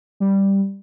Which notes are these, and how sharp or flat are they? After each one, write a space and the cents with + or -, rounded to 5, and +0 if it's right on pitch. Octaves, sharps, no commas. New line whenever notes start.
G3 +0